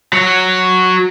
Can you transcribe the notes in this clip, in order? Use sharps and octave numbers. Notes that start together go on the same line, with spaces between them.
F#3